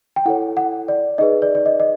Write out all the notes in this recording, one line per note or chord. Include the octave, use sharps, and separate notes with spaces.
G5
E4 A4 C#5 F#5
F#5
D5
D#4 G#4 B4 D#5
D5
D5
D#5
D#5